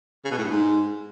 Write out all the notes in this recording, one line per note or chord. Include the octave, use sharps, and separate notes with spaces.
C#3
B2
A2
G2
G#2